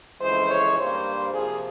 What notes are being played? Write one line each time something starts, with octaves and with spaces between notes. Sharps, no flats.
F2 C#3 E3 G#3 C5
C#5
G2 G3 A#3 C5
C3 F3 A#3 G#4